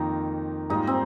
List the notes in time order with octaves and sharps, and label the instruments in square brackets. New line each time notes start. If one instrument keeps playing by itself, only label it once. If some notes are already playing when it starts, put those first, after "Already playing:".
Already playing: [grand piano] F2 D#3 A#3 F4 [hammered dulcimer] D#4
[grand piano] G#2 G3 A#3 F4 [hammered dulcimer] D#4
[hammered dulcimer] C4